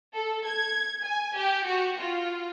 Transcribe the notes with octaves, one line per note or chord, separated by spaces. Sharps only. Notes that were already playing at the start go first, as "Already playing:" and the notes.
A4
G#6
G#5
G4
F#4
F4